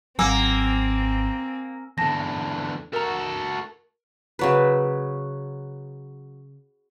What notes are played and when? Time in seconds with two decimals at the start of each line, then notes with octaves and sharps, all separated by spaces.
0.19 G#1 F#3 A#3 C4 G#5 E6
1.98 E2 D3 A5 A#6
2.93 F#4 A4 A#4 A#5
4.39 C#3 F#3 B4